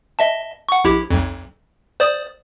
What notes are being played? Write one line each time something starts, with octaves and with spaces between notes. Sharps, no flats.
D#5 E5 A5
F#5 C#6
A#1 E4 G4
B1 F2
C5 D5 D#6